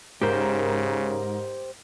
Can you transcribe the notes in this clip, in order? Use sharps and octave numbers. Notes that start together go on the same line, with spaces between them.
G#2 C#3 G4 A#4 C5